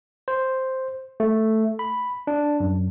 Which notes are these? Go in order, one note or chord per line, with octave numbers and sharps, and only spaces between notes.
C5
A3
B5
D4
F#2